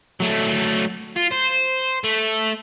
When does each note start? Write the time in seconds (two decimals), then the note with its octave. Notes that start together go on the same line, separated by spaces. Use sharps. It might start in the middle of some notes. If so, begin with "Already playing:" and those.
0.20 F#3 A3
1.16 F4
1.32 C5
2.04 A3